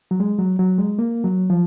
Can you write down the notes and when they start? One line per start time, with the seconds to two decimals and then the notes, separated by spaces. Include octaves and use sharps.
0.11 F#3
0.20 G#3
0.38 F#3
0.59 F#3
0.78 G#3
0.99 A#3
1.24 F#3
1.50 F3